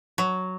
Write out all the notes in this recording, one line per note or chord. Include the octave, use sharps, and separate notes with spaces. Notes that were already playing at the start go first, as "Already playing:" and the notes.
F#3